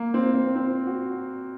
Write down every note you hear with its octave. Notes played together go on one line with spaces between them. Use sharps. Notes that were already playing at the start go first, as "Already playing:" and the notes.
Already playing: A#3
C4
C4
C4
F#4